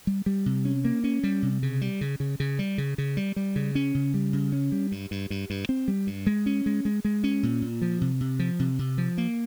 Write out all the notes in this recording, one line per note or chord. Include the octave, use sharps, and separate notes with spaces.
G3
G3
C3
C#4
A#3
C#4
G3
C3
C#3
G3
C#3
C#3
C#3
G3
C#3
C#3
G3
G3
C#3
C#4
C#3
G3
C#3
C#4
G3
G2
G2
G2
G2
C4
G3
G2
G#3
C#4
G#3
G#3
G#3
C#4
A#2
A#2
F3
C3
C3
F3
C3
C3
F3
A#3